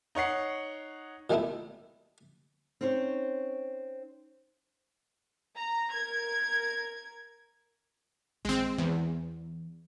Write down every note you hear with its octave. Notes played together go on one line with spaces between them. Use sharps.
D#4 C#5 F#5 C7
A#2 D#3 G#3 A3 B3 E4
C4 C#4 D#4 C5 C#5
A#5
A#4 G#6
A#1 D#3 G#3 C4
E2 E3